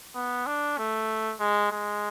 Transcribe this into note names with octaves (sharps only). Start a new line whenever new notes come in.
B3
D4
A3
G#3
G#3